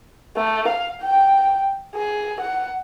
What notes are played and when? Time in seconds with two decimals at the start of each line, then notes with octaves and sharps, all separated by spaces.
0.36 A3
0.68 F5
1.02 G5
1.95 G#4
2.41 F#5